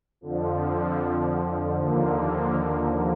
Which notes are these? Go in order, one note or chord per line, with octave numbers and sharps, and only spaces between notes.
F2 D3 F3
D#2 D3 F3 A#3